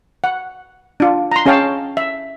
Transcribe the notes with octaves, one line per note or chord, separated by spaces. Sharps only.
F#5
D4 F4
A#5 C6
C#4 G#4 C#5 F5 G5 A5
E5